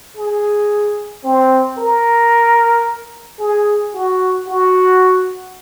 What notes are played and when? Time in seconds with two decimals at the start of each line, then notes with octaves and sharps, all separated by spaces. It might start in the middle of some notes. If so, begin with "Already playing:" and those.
0.17 G#4
1.24 C4
1.79 A#4
3.39 G#4
3.94 F#4
4.48 F#4